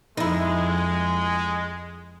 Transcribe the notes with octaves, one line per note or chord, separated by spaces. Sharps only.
F2 G#3 D#4 E4